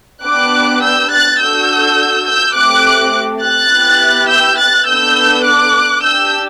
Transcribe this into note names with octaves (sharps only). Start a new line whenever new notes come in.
B3 D4 G4 D6 F#6
E6 G6
F#6 A6
D4 F#4 A4 E6 G6
E6 G6
A3 C4 G4 D6 F#6
F#6 A6
B3 E4 G4
E6 G6
F#6 A6
B3 D4 A4 E6 G6
D6 F#6
D4 G4 E6 G6